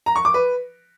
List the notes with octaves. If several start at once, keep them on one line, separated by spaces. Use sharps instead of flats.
A#5
C#6
D6
B4